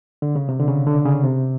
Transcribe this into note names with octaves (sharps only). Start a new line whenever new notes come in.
D3
C#3
C3
D3
C#3
D3
C#3
C3